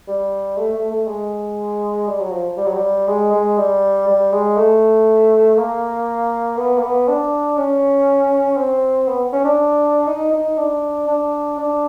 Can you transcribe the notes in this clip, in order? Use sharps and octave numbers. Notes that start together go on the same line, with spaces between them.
G3
A3
A3
A3
G#3
G3
F#3
F3
G3
F#3
G3
G#3
G#3
G3
G3
G#3
A3
A#3
B3
A#3
B3
D4
C#4
C4
B3
C#4
D4
D#4
D#4
D4
D4
D4